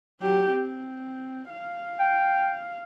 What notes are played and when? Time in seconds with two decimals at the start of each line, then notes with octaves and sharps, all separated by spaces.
0.21 F#3 G4
0.50 C4
1.49 F5
2.00 G5